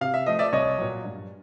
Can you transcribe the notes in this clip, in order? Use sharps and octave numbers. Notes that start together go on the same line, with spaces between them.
C3 F5
E5
F3 A3 D#5
D5 E5
C2 C#5 D#5
A#2 F#3
G2